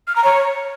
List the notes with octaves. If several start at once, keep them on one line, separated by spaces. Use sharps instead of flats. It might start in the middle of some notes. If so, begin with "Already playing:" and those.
F6
A#5
C#5